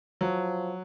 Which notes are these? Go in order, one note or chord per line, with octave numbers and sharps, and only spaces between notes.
F3 F#3